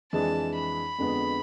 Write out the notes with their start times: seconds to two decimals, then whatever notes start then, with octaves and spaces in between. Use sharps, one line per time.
0.12 F2 E3 G#3 D4 G#4 A5
0.55 B5
0.98 F2 D3 G#3 B3